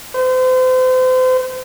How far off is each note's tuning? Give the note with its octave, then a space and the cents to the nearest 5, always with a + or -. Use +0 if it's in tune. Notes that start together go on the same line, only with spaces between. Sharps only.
C5 -35